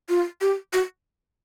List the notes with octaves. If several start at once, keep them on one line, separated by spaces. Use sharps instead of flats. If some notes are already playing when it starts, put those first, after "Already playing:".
F4
G4
F#4